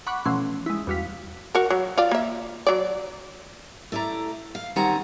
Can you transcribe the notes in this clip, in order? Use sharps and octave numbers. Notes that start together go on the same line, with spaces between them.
F#5 B5 C#6 D6 F#6
B2 E3 F3 A3 C#4 C6
G#3 E4
E2 G3 F#4 F5 B6
F#4 A#4
F#3
F4 D5
A#3 E5
F#3 D5
A3 E4 D5 G#5 A#5
F5
D#3 G3 C4 F#5 G#5 A#5